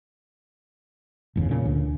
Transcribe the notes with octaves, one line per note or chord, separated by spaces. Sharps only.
G1 E2 C#3
A#2 C#3
D2